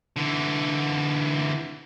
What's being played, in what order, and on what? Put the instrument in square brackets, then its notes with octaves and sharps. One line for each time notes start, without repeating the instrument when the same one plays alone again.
[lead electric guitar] D3 E3